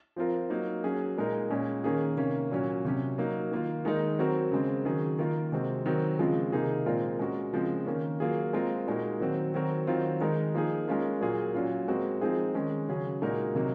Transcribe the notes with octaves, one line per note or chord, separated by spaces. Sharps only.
F3 C4 F4 A#4
F#3 A#3 D#4
F#3 C#4 G#4
A#2 G#3 D#4 A#4
A#2 G#3 C#4
D#3 A#3 C#4 G#4
C3 D#3 A#3 C#4
A#2 F#3 C#4
C3 F#3 C#4
F#3 A#3 D#4
D#3 A#3 F4
D#3 G#3 D#4 A#4
F#3 C4 F#4 A#4
C#3 G#3 C4
D#3 F#3 C#4 G#4
D#3 A#3 F4 A#4
C3 D#3 G#3 C4 F#4
D#3 F#3 C4
C#3 F3 G#3 C4 F4
C3 D#3 A#3 D#4 G#4
A#2 G#3 C4 F4 A#4
G#3 C#4 F#4 A#4
C#3 F3 G#3 C4
D#3 A#3 C#4
F#3 A#3 F4 G#4
G#3 C4 F4 A#4
A#2 G#3 D#4 F#4 A#4
D#3 F#3 C4 F#4
D#3 F#3 C4 F#4 A#4
D#3 F#3 C4 F4
D#3 G#3 D#4 A#4
F3 A#3 D#4 G#4
G#3 C#4 F4 A#4
A#2 F#3 A#3 F4 G#4
A#2 F#3 C#4 F4
G#3 C4 F#4 A#4
F3 G#3 C4 D#4 G#4
D#3 G#3 C#4
C#3 F#3 C#4 G#4
A#2 G#3 D#4 F#4 A#4
C3 F#3 A#3 D#4